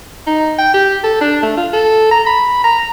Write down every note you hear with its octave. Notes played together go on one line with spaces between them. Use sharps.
D#4
G5
G4
A4
D4
A3
F4
A4
A#5
B5
A#5